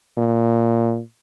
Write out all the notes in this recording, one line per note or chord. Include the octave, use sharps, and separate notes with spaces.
A#2